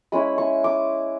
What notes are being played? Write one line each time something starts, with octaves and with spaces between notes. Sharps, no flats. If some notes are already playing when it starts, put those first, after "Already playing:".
G#3 C#4 E4 B5
C#6
D6